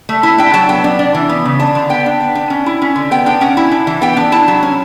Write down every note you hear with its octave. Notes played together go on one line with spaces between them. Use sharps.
A3
E4
D4 G5
F#3 A5
B3 G5
D4
D4
E3
B3
C#3
D4 A5
D3
B3 G5
D4
B3
D4
C#4
E4
C#4
D3
B3 G5
D4 G5
C#4 F#5
E4
D4
E3
B3 G5
D4
E4 A5
F#3
C#4